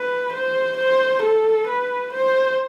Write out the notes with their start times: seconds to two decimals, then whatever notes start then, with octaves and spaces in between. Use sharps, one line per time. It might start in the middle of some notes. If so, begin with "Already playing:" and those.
Already playing: B4
0.33 C5
0.77 C5
1.23 A4
1.68 B4
2.13 C5